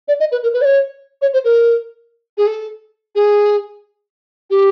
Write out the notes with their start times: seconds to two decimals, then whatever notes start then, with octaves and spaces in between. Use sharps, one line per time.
0.08 D5
0.19 D#5
0.31 B4
0.43 A#4
0.53 B4
0.61 D5
0.64 C#5
1.21 C#5
1.33 C5
1.44 A#4
2.37 G#4
2.47 A4
3.15 G#4
4.50 G4